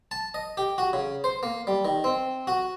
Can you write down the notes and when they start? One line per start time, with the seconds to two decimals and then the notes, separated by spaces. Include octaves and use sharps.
0.11 A5
0.34 D#5
0.57 G4
0.78 F#4
0.93 C#3
1.24 C5
1.43 A#3
1.67 G3
1.85 D#3
2.04 C4
2.47 F#4